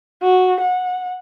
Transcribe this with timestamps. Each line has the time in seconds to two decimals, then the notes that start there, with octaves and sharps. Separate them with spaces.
0.23 F#4
0.61 F#5